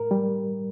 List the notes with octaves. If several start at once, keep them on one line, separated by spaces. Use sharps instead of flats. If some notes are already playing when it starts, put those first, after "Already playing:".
Already playing: A2 A#4
G3